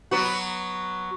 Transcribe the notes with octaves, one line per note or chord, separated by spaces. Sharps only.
F#3 B3 F#4